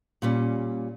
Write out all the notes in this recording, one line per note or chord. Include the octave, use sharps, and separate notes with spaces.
A#2 G3 C#4